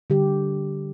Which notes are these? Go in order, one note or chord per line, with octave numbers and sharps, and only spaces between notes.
D3 G3 G4